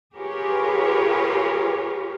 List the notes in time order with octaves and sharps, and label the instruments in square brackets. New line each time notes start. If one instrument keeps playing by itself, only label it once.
[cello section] F4 G4 G#4 A#4 B4 C#5